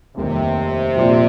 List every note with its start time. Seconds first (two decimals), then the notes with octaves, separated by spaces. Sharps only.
0.16 F1 D#2 C3 D#3 G3
0.96 A#2 F3 C4 G4 D5